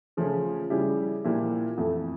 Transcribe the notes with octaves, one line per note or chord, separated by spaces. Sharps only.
C#3 F3 A3 C#4
C#3 G3 C#4 E4 G4
A#2 F3 A#3 E4 G4
F2 E3 A3